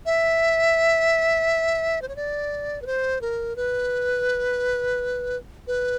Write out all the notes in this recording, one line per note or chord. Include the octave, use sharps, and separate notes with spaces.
E5
C5
C#5
D5
B4
C5
A#4
B4
B4